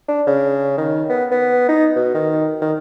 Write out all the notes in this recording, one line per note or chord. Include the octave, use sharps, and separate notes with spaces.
D4
C#3
D#3
B3
B3
D#4
B2
D#3
D#3